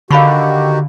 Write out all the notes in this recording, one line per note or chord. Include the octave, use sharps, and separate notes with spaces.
D3 D#3 F#4 G4 F5 B5 C#6